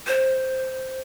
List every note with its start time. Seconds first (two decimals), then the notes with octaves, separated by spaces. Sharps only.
0.07 C5